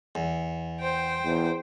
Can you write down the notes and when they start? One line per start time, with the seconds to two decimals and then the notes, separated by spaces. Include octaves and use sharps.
0.15 E2
0.80 C5 G5
1.24 E2